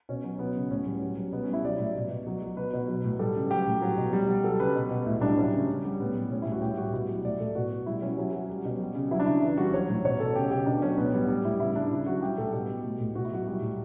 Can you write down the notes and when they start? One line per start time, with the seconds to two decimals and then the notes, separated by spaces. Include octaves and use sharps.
0.09 B2 C#4
0.24 F#3
0.39 F#3 B3
0.55 C#3
0.71 A2 C#4
0.87 G3
1.01 F#3
1.17 F#3
1.32 B2 B3
1.44 C#4
1.49 G3 E4
1.65 F#3 D5
1.80 A2
1.96 B2
2.11 B2
2.27 F#3
2.42 F#3
2.57 B2 B4
2.73 B2
2.88 F#3
3.04 A2
3.19 G3 A4
3.35 C#3
3.51 F#3 G4
3.67 A2
3.82 F#3
3.97 B2
4.13 G3
4.28 G3
4.44 F#3 A4
4.59 C#3 B4
4.76 B2
4.90 B2
5.06 A2 E4
5.21 G3 D4
5.37 F#3 C#4
5.54 C#3
5.69 C#3
5.85 G3
6.00 A2 B3
6.15 G3
6.31 A2 C#4
6.42 A2 E4
6.52 F#4
6.62 A2 G4
6.77 G3 F#4
6.93 B2 E4
7.09 F#3
7.25 A2 D5
7.39 A2 A4
7.55 B2 F#4
7.71 B2
7.86 G3 E4
8.02 G3 C#4
8.17 F#3 C#4
8.33 F#3
8.49 G3
8.65 B2
8.80 G3
8.95 C#3
9.11 F#3 E4
9.20 D4
9.26 C#3 E4
9.43 E3
9.57 G3 F#4
9.73 F#3 C#5
9.89 A2
10.05 B2 C#5
10.20 B2 A4
10.35 C#3 G4
10.51 C#3 G4
10.66 B2 D4
10.82 F#3 C#4
10.97 A2 B3
11.14 G3 B3
11.28 G3
11.45 A2 E4
11.60 C#3 E4
11.76 C#3 D4
11.91 C#3 E4
12.06 F#3 F#4
12.22 G3 G4
12.38 A2 A4
12.53 B2 G4
12.70 B2
12.85 A2
13.01 A2
13.15 B2 F#4
13.25 E4
13.32 F#3 F#4
13.47 G3
13.62 A2